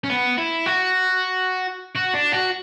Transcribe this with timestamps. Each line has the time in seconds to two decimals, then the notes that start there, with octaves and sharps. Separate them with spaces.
0.04 C#4
0.09 B3
0.38 E4
0.66 F#4
1.95 F#4
2.14 D4
2.32 F#4